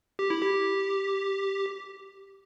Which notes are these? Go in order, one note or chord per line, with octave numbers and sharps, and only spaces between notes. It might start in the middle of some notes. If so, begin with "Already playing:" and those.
G4
E4
G4